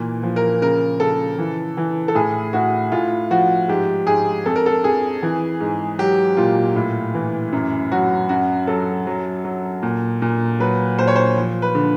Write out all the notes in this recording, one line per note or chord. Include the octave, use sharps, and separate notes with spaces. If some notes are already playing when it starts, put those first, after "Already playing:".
Already playing: A#2 E3
F3
A#4
C#3 A#4
C#3 A4
E3
E3
A4
A2 G#4
A2 F#4
A2 F4
F3 F#4
G#2 G4
G#2 G#4
F2 A4
A#4
A4
F2 G#4
E3
G#2
F#3 G4
A#2 F4
A2
E3
F#2
F#3 F#4
F#2 F#4
F#3 A4
F#3
F#3
A#2
A#2
F#3 B4
A#2 C5
C#5
C5
F3
B4
D3